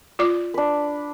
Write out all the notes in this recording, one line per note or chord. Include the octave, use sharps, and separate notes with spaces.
F4 D5 D6
D4 B4